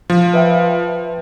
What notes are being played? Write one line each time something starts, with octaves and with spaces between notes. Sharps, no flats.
F3
B4 E5 G5